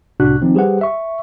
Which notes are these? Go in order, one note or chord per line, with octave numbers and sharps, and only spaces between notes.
C2 A2 C3 D4 F#4 F#6
D#3 F3 C4 D#4
G3 G4 G#4 B4 C5 F#5
E5 C#6